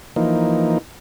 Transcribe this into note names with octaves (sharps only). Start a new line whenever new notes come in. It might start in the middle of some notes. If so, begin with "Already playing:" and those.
E3 F3 A#3 D#4